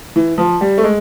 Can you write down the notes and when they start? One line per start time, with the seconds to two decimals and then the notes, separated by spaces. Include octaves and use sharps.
0.16 E3
0.38 F3
0.61 G3
0.78 A3
0.84 G#3